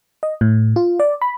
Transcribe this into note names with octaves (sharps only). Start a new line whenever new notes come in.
D#5
A2
F4
D5
B5